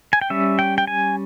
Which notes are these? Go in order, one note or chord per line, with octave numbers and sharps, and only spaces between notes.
G#5
G5
G3 C#4 E5
G5
G5
G#5